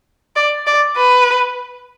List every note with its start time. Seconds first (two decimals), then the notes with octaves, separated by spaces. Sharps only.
0.36 D5
0.67 D5
0.97 B4